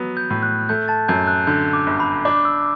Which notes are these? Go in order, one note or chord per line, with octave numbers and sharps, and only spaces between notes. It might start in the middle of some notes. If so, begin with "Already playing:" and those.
Already playing: F#3 B3
G6
A2
F#6
A3 G6
A5 A6
F#2 G6
F#6
D3 G6
D6
G1
B5
D4 D6
E6